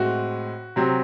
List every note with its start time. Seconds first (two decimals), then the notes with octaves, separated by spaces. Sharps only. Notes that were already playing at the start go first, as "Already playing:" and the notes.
Already playing: A2 G#3 C4 F#4
0.76 C3 F#3 C4